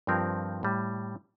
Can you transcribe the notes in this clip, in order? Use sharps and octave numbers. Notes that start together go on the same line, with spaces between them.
G2 F3 C4 G4 A#4
A2 G3